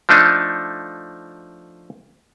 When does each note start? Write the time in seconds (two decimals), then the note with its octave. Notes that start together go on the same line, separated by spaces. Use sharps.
0.09 F3 A3 D4 D#4